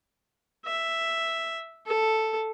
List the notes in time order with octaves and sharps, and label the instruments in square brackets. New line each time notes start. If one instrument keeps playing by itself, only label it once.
[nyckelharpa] E5
A4